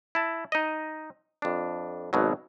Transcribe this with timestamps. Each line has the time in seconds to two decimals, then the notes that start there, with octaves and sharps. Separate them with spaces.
0.15 E4 A5
0.52 D#4 D#5
1.42 F2 D4
2.13 G#1 B2 F#3